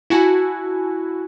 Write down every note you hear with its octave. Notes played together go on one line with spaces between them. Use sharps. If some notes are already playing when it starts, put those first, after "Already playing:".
E4 F#4 G#5 A5